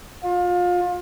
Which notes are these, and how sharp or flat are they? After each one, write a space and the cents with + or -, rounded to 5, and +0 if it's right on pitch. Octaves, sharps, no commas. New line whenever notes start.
F4 +30